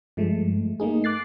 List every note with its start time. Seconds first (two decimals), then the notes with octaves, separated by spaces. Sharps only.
0.17 G2 F3 G#3 A3
0.80 A3 A#3 D#4 G#4
1.04 D6 F#6 A6 C7